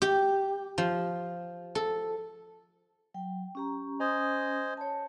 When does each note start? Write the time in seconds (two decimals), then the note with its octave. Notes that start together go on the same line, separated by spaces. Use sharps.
0.02 G4
0.78 F3
1.75 A4
3.14 F#3 G5
3.55 C#4 G4 A#5
4.00 C#4 C5 D#5 G#5 D#6
4.77 C#5 A5